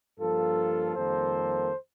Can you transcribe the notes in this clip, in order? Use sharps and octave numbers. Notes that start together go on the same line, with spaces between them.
G2 F3 A#3 F4 A4
F2 D#3 G3 A#3 A4 C5